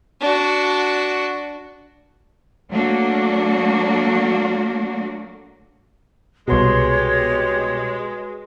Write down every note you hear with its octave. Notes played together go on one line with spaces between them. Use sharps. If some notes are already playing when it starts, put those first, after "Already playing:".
D4 F#4
F#3 A3 A#3 D4 F#4
C2 B2 G#3 F#4 G4 B4 C#5 C6